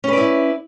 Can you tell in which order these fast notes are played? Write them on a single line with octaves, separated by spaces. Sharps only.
C#4 B4 D5 E4